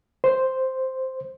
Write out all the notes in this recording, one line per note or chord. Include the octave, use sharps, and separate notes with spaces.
C5